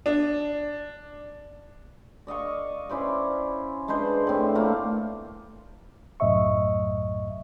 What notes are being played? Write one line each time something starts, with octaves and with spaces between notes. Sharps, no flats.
D4
D5 D#5 F5 C#6
C#4 E4 C5 D5
G#3 D4 B4 C5
A2 C4
A3 A#3 F4
C2 F#2 A2 D#5 E5 C#6